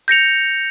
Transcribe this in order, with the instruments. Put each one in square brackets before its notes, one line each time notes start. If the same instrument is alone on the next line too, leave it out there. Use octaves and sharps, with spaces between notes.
[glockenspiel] G6 A#6 C#7 F7